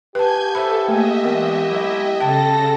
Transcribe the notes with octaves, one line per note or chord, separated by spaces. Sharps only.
G4 B4 G#5 A5 G6 G#6
A4 C5 E5 A5 B5
A3 A#3 G#4 B4 D#5 E5 G#5
E3 G#3 B3 D4 A#4
F#3 G#3 E4
C#3 A4 G5 A5 A#6